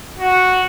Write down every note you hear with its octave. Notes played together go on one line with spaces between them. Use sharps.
F#4